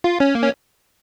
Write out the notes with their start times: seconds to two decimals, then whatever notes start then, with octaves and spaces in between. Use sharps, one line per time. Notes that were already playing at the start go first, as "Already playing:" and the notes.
0.04 F4
0.20 C#4
0.35 A#3
0.43 C#4